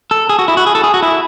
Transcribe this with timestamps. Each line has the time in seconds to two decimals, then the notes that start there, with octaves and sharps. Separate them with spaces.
0.11 A4
0.29 G#4
0.39 F#4
0.48 E4
0.57 F#4
0.66 G#4
0.75 A4
0.84 G#4
0.94 F#4
1.03 E4